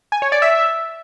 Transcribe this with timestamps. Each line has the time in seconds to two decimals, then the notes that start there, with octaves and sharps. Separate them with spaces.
0.12 G#5
0.22 C#5
0.32 D5
0.42 E5